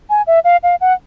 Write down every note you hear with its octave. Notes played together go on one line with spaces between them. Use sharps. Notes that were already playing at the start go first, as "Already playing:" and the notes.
G#5
E5
F5
F5
F#5